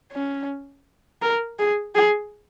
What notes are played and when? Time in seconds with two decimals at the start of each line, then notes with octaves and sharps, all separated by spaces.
0.12 C#4
1.22 A#4
1.59 G#4
1.95 G#4